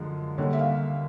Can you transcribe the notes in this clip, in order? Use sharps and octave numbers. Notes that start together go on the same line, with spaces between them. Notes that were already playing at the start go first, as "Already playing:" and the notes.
Already playing: F#2 D3 F3 G#3
D#2 D3 G3 C#5
E5
F5